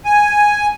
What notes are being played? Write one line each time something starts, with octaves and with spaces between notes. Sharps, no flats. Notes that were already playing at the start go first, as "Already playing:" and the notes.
G#5